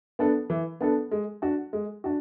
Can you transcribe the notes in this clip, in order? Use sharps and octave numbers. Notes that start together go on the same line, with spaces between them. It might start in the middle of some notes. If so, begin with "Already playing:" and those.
B3 D4 A4
E3
B3 D4 A4
G#3
D4 F#4
G#3
D4 F#4